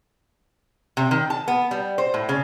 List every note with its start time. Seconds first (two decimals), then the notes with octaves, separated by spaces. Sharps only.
0.97 C3
1.11 D#3
1.30 A5
1.48 B3
1.71 G3
1.98 C5
2.14 A2
2.29 C#3